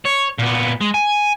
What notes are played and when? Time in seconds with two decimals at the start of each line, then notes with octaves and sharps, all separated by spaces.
0.05 C#5
0.38 A#2 B3
0.81 G#3
0.94 G#5